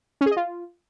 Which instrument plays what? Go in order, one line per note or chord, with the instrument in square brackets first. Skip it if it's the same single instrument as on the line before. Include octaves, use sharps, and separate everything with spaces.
[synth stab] C#4
G#4
D#5
F4